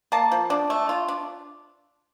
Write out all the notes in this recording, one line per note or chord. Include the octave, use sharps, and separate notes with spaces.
A#3 A5
F3
D4
A3
F4
D4